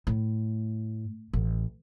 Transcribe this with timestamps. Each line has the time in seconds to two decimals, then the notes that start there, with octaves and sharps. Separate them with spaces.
0.07 A2
1.33 A1